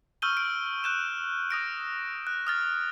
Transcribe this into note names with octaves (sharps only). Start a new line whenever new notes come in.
C#6 E6 F6 G6 D#7 G7
D7
F#6 G6 E7
D#6 A#6 D7
F#6
D#6 F6 A6